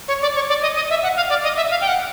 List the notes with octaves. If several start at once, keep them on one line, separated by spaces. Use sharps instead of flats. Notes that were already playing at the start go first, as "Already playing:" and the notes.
C#5
D5
C#5
D5
D#5
D#5
E5
F#5
F5
D5
D#5
E5
F5
G5
F#5